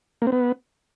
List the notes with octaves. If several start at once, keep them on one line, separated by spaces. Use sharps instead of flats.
A#3
C4
B3